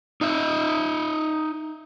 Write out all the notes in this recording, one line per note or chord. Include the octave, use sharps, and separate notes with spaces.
D#4 D#5 E5